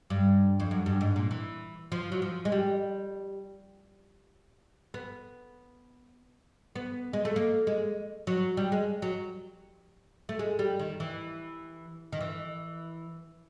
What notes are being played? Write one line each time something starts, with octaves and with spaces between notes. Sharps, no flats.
G2
F2
F#2
G2
G#2
A#2
E3
F3
F#3
F3
G#3
G3
B3
B3
G#3
A3
A#3
G#3
F#3
G3
G#3
F#3
A3
G#3
G3
D#3
E3
D#3
E3